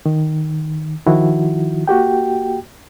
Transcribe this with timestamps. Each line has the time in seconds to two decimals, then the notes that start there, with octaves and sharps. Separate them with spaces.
0.06 D#3
1.06 D#3 F3 E4 F#4
1.88 A#3 F#4 G4 G5